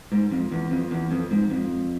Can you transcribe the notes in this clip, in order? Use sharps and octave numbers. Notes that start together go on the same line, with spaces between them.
G#2
F2
E2
F2
E2
F2
G#2
F2